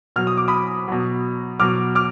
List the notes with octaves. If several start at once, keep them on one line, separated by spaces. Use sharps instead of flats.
B2 F#3 F6
D#6
D6
B5 D#6
B2 F#3
B2 F#3 D6 F6
D6 F6